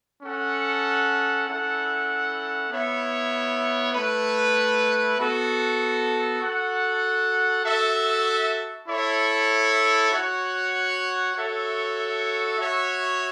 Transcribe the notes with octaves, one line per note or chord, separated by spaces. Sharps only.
C#4 A4 F#5
C#4 E4 A4 F#5
B3 E4 C#5 E5
A3 E4 B4
B3 F#4 A4
F#4 A4 F#5
F#4 A4 E5
E4 A4 C#5 E5
F#4 C#5 F#5
F#4 A4 C#5 E5
F#4 C#5 E5